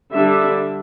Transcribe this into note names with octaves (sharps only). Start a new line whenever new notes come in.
D3 G3 D4 E5